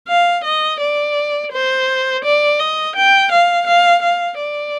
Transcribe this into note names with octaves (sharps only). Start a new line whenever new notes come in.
F5
D#5
D5
C5
D5
D#5
G5
F5
F5
F5
D5